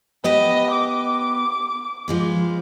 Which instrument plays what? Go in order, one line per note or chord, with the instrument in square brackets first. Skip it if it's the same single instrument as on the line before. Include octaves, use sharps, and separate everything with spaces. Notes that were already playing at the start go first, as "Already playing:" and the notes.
[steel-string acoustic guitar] B3 G4 B4 [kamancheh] D#5
[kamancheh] D6
[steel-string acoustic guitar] F3 G#3 B3